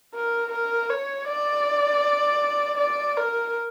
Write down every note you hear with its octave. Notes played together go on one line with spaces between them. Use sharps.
A#4
A#4
C#5
D5
D5
A#4